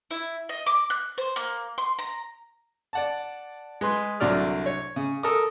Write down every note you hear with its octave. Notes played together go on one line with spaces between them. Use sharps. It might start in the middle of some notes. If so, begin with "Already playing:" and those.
E4
D#5
D6
F#6
C5
A#3
C6
A#5
D5 F#5 A5
G#3 B4 C6
C2 D3 F#3 D5 F6
C#5
C#3
A4 A#4 D#6